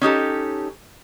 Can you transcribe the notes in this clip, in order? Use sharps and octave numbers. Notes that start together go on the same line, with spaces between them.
C#4 D#4 G4 A4